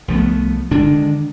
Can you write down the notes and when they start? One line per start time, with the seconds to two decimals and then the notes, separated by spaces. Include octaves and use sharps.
0.08 C2 F3 A3 B3
0.71 D3 D#3 G#3 D4